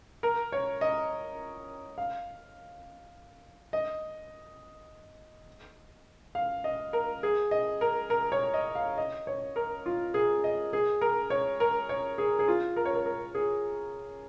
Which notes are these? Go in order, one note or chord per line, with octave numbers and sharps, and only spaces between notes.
A#4
C#5
D#5
F5
D#5
F5
D#5
A#4
G#4
D#5
A#4
A#4
C#5
D#5
F5
D#5
C#5
A#4
F4
G#4
D#5
G#4
A#4
C#5
A#4
C#5
G#4
G#4
F4
A#4
C#5
A#4
A#4
G#4